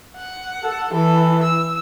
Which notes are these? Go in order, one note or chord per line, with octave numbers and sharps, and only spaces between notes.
F#5
A4
E3 A4
E6